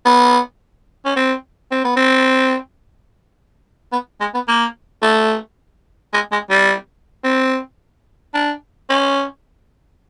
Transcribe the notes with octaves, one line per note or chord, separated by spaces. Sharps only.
B3
C#4
C4
C4
B3
C4
B3
G#3
B3
A#3
A3
G#3
G#3
G3
C4
D4
C#4